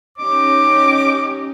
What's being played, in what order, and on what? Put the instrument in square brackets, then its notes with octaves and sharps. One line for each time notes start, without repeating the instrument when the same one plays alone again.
[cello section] C#4 D#4 G4 [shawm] D6